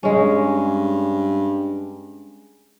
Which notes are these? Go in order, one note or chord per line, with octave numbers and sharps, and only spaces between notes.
G2 G#3 C#4